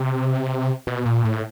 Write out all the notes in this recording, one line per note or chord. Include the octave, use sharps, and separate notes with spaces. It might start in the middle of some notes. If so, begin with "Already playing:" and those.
Already playing: C3
B2
A#2
A2